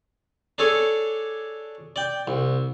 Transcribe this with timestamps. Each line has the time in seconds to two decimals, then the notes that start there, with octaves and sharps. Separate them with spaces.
0.58 D4 G#4 A4 C#5 D6
1.96 D5 G5
2.27 C2